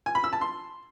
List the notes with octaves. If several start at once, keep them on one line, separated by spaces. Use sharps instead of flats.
G#5
B5
E6
A5
C6